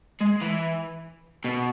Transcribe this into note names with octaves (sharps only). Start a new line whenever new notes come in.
G#3
E3
B2